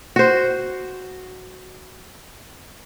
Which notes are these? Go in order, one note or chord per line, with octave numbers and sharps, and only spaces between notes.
F#4 C5